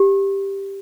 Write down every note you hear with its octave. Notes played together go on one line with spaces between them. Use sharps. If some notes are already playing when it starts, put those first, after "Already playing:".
Already playing: G4